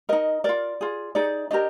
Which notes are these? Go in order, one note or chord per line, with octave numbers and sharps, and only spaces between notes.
D#4 A#4 D#5
F4 A#4 D5
F4 G#4
D#4 G#4 D5
D4 G4 A#4 D#5